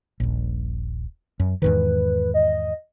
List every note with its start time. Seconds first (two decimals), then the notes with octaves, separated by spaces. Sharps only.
0.20 D#1 A#1
1.40 F#2
1.62 E2 G#2 D#3 B4
2.34 D#5